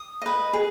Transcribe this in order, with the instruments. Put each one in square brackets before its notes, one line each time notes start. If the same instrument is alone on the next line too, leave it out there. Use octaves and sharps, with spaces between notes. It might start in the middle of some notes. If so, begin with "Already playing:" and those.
Already playing: [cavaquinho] D#6
B4 D#5
G#4